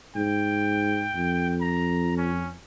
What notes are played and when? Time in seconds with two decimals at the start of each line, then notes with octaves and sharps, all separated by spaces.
0.16 G#2 G5
1.16 F2
1.61 A#5
2.17 C#4